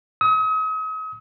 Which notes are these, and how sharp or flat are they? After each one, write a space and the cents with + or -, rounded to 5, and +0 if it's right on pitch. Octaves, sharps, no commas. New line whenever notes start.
D#6 +40